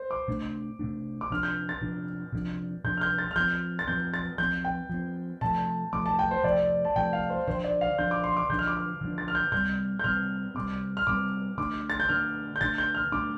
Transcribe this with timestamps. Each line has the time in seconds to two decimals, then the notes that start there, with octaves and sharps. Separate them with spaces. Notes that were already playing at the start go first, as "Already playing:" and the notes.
Already playing: C5
0.11 D6
0.28 C3 A3 D4
0.79 C3 A3 D4
1.21 D6
1.30 C3 F3 D4 F6
1.43 G6
1.69 A6
1.82 C3 F3 D4
2.33 C3 F3 D4
2.84 C3 F3 D4 G6
2.97 F6
3.01 G6
3.19 A6
3.31 F6
3.36 F3 C4 G6
3.79 A6
3.88 F3 C4 G6
4.14 A6
4.38 F3 C4 G6
4.65 G5
4.89 F3 C4
5.41 C3 F3 A3 A5
5.93 C3 F3 A3 D6
6.06 A5
6.19 G5
6.31 C5
6.44 C3 F3 A3 D5
6.85 A5
6.96 C3 F3 A3 G5
7.13 F5
7.30 C5
7.48 D3 F3 D4 C5
7.64 D5
7.81 F5
7.99 D3 F3 D4 G6
8.11 D6
8.24 C6
8.37 D6
8.50 D3 F3 D4 G6
8.59 F6
8.67 D6
8.77 F6
9.01 D3 F3 D4
9.18 A6
9.28 F6
9.35 G6
9.52 C3 G3 C4 G6
9.99 G6
10.04 C3 G3 C4 F6
10.55 C3 G3 C4 D6
10.97 F6
11.07 C3 G3 C4 D6
11.58 D3 A3 D4 D6
11.90 A6
12.00 G6
12.09 D3 A3 D4 F6
12.56 G6
12.61 D3 A3 D4 A6
12.78 G6
12.95 F6
13.12 D3 A3 D4 D6